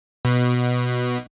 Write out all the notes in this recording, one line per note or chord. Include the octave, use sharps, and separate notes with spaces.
B2